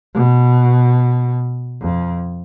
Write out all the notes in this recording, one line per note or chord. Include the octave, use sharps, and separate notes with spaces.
B2
F2